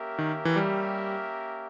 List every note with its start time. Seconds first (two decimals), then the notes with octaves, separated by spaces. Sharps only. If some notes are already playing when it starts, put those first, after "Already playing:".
Already playing: A#3 C#4 G4 A#4 E5
0.19 D#3
0.45 E3
0.56 G3